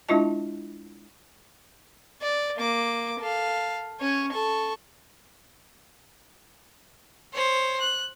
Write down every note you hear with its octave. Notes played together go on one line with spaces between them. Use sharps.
G#3 D4 E4 F4 D#5 A5
D5
A#3 D6
A4 F5
C#4 C#5
A4 C#6
C5 C#5
F#6